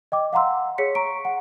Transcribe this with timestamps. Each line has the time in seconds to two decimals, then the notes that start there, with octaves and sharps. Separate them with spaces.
0.12 D#5 G5 D6
0.33 F5 F#5 A#5 C6 E6
0.78 G#4 C#5 B6 C#7
0.95 A#5 C#6 D7
1.25 F#5